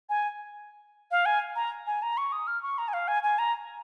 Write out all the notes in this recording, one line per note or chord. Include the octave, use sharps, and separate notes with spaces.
G#5
F5
G#5
A#5
G#5
A#5
C#6
D#6
F6
C#6
A#5
G#5
F5
G#5
G#5
A#5